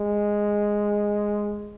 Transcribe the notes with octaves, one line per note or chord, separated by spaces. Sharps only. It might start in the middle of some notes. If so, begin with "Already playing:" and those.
Already playing: G#3